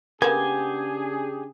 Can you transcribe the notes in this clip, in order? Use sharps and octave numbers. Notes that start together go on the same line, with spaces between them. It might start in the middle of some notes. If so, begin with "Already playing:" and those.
C#3 A#3 B3 D4 G4 G#4 G#5